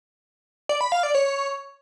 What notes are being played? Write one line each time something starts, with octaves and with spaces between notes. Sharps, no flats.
D5
B5
F5
D5
C#5